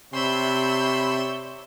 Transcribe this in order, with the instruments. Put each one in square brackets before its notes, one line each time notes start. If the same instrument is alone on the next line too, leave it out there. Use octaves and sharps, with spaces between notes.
[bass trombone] C3 [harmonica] C#5 D5 E5 [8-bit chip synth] B5 C6 [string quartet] E6 G6